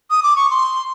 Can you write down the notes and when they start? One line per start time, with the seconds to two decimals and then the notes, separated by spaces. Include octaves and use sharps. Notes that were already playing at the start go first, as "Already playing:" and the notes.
0.11 D#6
0.23 D6
0.36 C#6
0.50 C6